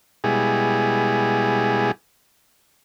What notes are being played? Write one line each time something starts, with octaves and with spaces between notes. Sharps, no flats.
B2 G3 G#3 E4 G#4